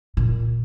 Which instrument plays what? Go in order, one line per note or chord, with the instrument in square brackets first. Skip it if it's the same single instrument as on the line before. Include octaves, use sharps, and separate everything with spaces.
[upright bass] A#2